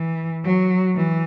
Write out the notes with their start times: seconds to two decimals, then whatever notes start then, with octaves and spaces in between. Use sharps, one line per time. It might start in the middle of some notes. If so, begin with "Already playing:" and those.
Already playing: E3
0.45 F#3
0.96 E3